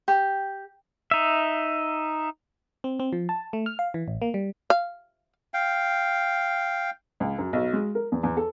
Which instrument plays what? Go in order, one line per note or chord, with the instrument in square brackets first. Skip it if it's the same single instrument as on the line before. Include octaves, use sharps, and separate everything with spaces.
[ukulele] G4
[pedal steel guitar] D#4 E5
[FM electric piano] C4
C4
F3
A5
A3
F6
F5
E3
A1
A#3
G3
[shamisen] F5
[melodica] F5 G5
[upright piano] C#2
F#2
B1
G#3
A#4
E2
E2
A4